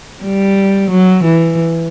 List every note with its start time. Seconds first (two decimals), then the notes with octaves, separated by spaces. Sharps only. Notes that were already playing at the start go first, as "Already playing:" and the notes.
0.24 G3
0.91 F#3
1.24 E3